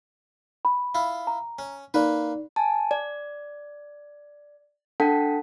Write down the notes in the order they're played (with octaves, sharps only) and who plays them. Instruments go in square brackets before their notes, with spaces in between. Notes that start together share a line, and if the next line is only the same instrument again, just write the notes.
[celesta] B5
[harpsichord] E4 F4
[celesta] A#5
[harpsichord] C#4
[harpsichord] A#3 B4 [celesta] D#4 D5
[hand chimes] G#5 A5
D5
D4 A4 F#5 G5 A5 B6